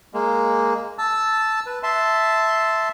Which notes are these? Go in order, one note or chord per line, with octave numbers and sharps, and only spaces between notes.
G#3 A#3
A5 E6
B4
E5 A5 C6